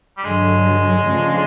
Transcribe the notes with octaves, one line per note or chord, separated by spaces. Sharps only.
G3
G2 D3 F#3 G#3
C#3 F3 A3 D4 F4